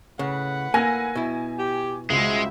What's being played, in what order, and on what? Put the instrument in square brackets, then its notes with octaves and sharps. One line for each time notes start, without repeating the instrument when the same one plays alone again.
[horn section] A2 B4 F#5 [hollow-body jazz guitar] C#3
[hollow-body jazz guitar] A#3 [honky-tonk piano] G#5 E6 A#6
[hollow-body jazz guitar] B2 E4
[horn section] G4
[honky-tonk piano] C#2 [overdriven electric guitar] G#3 [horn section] F#4 C5 E5